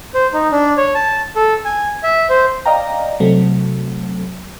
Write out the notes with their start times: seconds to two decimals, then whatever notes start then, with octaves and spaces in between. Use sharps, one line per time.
0.14 C5
0.33 D#4
0.52 D4
0.77 C#5
0.95 A5
1.36 A4
1.65 G#5
2.03 E5
2.29 C5
2.66 D5 D#5 F5 G5 A#5
3.20 C3 F#3 A3